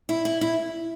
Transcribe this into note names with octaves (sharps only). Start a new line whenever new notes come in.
E4
E4
E4